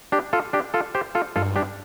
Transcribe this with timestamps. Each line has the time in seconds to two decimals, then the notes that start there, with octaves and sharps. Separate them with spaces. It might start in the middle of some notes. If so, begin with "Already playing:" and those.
0.12 D4 G4
0.33 F4 A4
0.53 D4 G4
0.74 F4 A4
0.95 G4 C5
1.15 F4 A4
1.36 G2 F4 A4
1.56 D4 G4